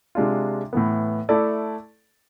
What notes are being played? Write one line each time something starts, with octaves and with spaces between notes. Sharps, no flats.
C3 G#3 D4 F4
A2 E3 B3
A3 E4 A4 D5